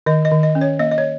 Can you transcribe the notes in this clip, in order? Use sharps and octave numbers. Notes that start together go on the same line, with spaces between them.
D#3 D#5
D#5
D#3
D#5
C#4
C#5
A#3 D#5
D#5
C#5